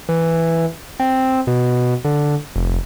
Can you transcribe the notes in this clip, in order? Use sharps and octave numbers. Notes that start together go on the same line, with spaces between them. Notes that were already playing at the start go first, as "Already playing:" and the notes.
E3
C4
B2
D3
F1